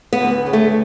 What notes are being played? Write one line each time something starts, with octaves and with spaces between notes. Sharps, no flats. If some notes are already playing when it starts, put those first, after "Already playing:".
B3
D2
C#3
A3